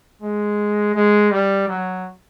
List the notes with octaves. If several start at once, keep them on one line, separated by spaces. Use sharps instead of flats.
G#3
G#3
G3
F#3